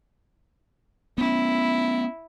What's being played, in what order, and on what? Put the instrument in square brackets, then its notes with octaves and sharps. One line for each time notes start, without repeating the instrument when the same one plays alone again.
[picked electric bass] B3 C#4 [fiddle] E4